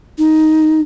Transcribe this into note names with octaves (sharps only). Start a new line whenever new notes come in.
D#4